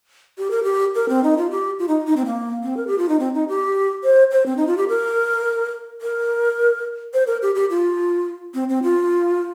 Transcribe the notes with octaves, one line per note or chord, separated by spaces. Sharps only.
G4
A#4
G4
A#4
C4
D#4
F4
G4
F4
D#4
D#4
C4
A#3
C4
A#4
G4
F4
D#4
C4
D#4
G4
C5
C5
C4
D#4
F4
G4
A#4
A#4
C5
A#4
G4
G4
F4
C4
C4
F4